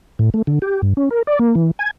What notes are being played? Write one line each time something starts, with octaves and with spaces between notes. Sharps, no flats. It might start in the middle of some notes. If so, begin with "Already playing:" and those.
A2
A3
D3
G4
G2
C#4
A#4
D5
A#3
E3
G#5